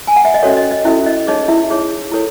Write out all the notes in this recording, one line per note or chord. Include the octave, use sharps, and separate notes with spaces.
G#5
F#5
E5
D#5
C#4 F#4 A4 C#5
D#5
D#5
C#4 E4 F#4 A4 E5
D#5
D#4 G#4 C#5 D#5
E4 E5
D#4 G#4 C#5
E4 A4 C#5